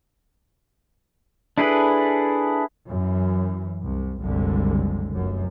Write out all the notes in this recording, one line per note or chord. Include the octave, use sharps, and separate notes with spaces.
D4 E4 G#4 A4 B4
F#2 E3
C2
F#1 C2 D3 G#3
F1 F#2